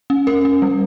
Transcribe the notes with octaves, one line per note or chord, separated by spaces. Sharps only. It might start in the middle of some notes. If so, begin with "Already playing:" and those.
C#4
C#4 A#4
C#4
G3